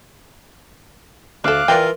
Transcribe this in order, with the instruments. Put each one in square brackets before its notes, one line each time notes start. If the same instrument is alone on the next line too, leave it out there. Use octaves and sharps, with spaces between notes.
[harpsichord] D2 [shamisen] D4 A4 [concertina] F5 D6 F#6
[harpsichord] E3 F4 A#4 [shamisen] D5 G5